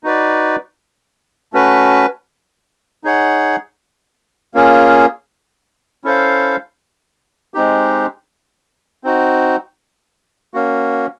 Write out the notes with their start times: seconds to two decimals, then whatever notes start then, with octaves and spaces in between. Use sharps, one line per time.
0.04 D#4 F#4 B4 D5
1.53 A3 C#4 F#4 B4
3.04 D#4 G#4 C#5 F#5
4.54 A#3 C#4 F4 G#4
6.04 C#4 E4 A4 C5 F5
7.54 G#3 C4 D#4 G4
9.04 C4 D#4 F#4
10.54 A#3 C#4 F#4